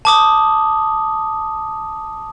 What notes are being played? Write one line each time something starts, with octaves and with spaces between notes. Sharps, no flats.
A5 D6 D#6